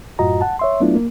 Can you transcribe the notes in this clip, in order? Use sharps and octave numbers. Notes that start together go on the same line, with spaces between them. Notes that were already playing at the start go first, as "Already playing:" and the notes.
F#2 A2 F4 F#4 D#5 A#5
F#5 A5
C#5 E5 C6
F#3 A3 B3 D4 E4 F4
A#3